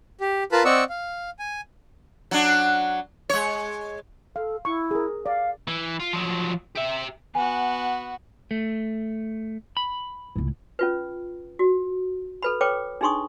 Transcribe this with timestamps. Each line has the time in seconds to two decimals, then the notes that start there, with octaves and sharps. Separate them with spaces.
0.21 G4
0.52 F4 A#4 B4 A5 B5
0.65 C4 D5 D#5 F#5 C#6 E6
0.89 F5
1.39 G#5
2.31 F#3 D4
3.30 G#3 C#5
4.36 A4 F5
4.65 E4 C#6
4.91 G#4 A#4
5.26 D5 F5
5.67 E3
6.00 F4
6.13 F3 F#3
6.76 G4 E5
7.35 B3 F#4 G#5
8.51 A3
9.77 B5
10.36 C#2 A2
10.79 C#4 F4 B4
11.59 F#4
12.42 A4 B4 B5
12.61 A4 B4 C#5 G5 D6
13.01 D4 D#4 G#4 C6 C#6 D#6